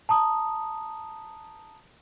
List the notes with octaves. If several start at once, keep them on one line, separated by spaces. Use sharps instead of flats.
A5 A#5 D#6